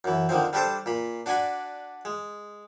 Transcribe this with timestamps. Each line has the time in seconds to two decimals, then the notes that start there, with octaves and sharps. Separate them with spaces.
0.04 F#2 E3
0.29 D3 D#3 F3 C4
0.53 G3 D4 G4 A4 C5
0.86 A#2 B5
1.26 D4 F#4 D5 G#5 B5
2.05 G#3